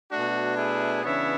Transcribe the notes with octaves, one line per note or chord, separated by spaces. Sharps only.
B2 A3 D4 F#4
E4 G#4
C#3 E3 B3 D4 C#5 E5